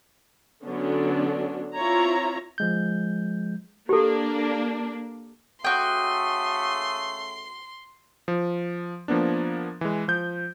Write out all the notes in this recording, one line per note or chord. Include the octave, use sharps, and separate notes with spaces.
D3 F#3 B3 C#4 D4
C4 E4 F4 C#5 A#5
F3 G#3 G6
A#3 D4 G4 A4
C#3 A3 F#4 G5 C6 D#6
F3
F3 A#3 B3 D4
E3 G#3
F3 G6